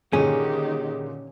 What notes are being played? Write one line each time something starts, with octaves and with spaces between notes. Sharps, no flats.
A#2 D3 D#3 G3 C#4 G4 G#4